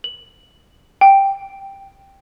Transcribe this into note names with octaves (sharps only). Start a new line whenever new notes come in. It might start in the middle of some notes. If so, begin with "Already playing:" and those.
F#7
G5